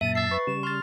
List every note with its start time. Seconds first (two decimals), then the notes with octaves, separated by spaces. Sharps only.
0.01 F#2 A#2 E5 A5 D#7
0.15 E5 A6 C7
0.31 B4 C#6
0.47 C#3 G3 E7
0.63 C6 F6 A6